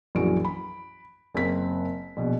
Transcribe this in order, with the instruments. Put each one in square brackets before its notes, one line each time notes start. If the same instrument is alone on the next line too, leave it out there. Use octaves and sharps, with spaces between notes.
[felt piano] A#1 F#2 E3 F#4 D7
B5
F#1 C4 B6
A#1 B2